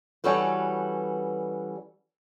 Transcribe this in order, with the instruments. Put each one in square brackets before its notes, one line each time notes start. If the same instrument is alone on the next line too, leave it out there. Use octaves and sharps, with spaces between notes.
[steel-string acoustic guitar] E3 G3 C#4 F#4 A4 B4